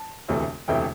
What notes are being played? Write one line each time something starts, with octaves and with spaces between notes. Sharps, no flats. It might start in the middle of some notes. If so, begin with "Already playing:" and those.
Already playing: A5
E1 D2 C3 E3 A3
E1 D2 C3 E3 A3 G5